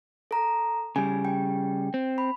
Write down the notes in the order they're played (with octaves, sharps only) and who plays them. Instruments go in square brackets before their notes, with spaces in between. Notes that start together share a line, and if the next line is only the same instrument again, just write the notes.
[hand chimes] A4 A#5
[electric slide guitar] C#3 G3 [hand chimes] G#5
[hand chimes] G5
[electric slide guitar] C4
[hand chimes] B5